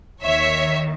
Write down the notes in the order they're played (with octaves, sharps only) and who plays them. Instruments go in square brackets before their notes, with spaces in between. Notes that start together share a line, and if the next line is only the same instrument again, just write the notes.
[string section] D#2 D#3 C#5 E5